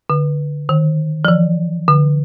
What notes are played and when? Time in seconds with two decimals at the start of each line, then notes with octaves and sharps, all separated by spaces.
0.10 D3
0.69 D#3
1.25 F3
1.28 E3
1.88 D3